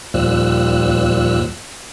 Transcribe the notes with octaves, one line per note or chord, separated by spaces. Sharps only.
D#2 A#2 F3 G3 E6 F#6